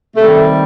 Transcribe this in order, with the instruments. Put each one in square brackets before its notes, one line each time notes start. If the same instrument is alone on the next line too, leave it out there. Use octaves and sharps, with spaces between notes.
[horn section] C3 D#3 G3 A3